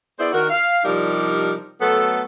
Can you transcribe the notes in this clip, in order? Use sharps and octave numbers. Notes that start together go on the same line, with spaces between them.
B3 E4 G#4 C5 D5
D#3 F#4 A#4
F5
C3 F3 G3 D4 D#4 A#4
F#3 A3 B3 A4